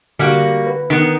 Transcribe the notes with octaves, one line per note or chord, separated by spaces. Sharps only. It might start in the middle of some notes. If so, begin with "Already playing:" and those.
D3 G3 A#3 F#4
B4
D#3 B3